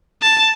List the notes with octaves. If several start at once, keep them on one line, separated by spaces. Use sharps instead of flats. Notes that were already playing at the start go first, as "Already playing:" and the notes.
A5